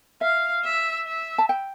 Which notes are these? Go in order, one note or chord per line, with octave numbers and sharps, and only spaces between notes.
E5 F5
E5
E5
A5
G5